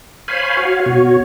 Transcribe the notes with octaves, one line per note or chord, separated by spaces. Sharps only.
C5 C#5 F5 G#5 B5
F#4 C#5 F5
B2 F#4 C#5